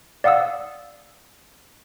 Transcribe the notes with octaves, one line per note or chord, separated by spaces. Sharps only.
D5 F5 F#5 D#6 E6